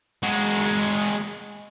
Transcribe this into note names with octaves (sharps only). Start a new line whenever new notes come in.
G#3 F#4